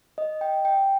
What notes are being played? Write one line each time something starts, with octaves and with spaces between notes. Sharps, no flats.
D#5
G5
G5